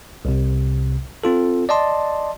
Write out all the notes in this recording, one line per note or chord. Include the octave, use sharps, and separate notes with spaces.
C2 C3
C4 F4 A4
D5 D#5 A5 C6